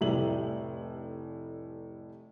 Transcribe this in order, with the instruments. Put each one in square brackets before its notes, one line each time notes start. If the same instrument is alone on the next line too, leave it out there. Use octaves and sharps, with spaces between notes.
[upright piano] F1 A2 G3 G4 E5 F#7